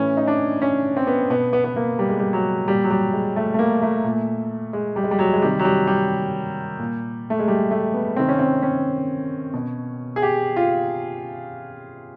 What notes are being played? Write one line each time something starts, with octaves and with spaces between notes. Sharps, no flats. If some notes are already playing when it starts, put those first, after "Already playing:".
Already playing: A2 E3 C#4
D#4
D4
C#4
C4
B3
B2 B3
B3
B3
A#3
G3
G#3
G3
F#3
A#2 G3
F#3
G3
G#3
A3
A3
A#3
A3
A#2
G#3
G3
G#3
G3
F#3
G#3
C3 D#3 G3
F#3
G3
G3
A#2
A3
G#3
G3
A3
B3
C3 D#3 C4
C#4
C4
C#4
B2
G#4
G4
F4